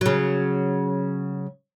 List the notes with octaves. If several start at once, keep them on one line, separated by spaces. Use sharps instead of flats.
C#3 F#3